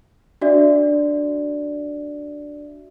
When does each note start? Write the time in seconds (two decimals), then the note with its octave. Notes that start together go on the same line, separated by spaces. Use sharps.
0.41 D4 F#4 D5 E5